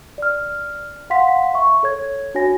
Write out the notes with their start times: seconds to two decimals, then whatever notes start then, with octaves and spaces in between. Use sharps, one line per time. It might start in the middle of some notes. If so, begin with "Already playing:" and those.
0.18 D5 F6
1.10 F5 F#5 C6 B6
1.54 E5 C#6
1.83 A4 C#5 G#6
2.35 D4 F#4 C#5 G#5 A#6